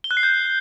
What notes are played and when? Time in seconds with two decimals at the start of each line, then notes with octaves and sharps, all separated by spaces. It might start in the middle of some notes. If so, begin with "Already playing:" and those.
0.04 G7
0.11 F#6
0.17 C7
0.23 G6